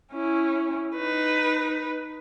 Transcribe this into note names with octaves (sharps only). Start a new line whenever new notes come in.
C#4 E4
D#4 B4